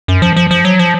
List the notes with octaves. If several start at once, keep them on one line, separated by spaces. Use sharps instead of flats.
F#2
F3
F3
F3
F#3
F3